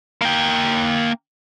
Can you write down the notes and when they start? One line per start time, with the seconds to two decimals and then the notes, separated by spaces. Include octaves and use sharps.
0.22 A#3 G5